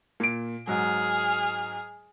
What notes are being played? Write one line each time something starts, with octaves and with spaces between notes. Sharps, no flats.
A#2 D7
G#2 F#3 G#4 F6